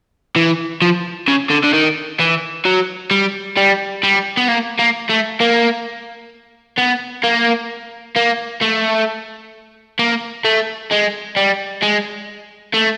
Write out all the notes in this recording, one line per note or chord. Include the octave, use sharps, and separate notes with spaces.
E3
F3
C#3
D3
D3
D#3
E3
F#3
G3
G3
G3
B3
A#3
A#3
A3
A#3
B3
A#3
A#3
A3
A#3
A3
G#3
G3
G#3
A3